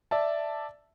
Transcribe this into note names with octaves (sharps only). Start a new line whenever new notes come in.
D5 E5 A5